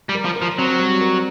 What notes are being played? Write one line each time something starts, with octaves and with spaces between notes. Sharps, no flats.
G3
A#4
F3
A#4
F3
F#3 C4
G3
A#4